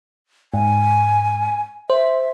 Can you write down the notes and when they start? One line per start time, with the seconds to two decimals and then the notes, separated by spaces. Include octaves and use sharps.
0.54 G#2 G#5
1.90 C5 E5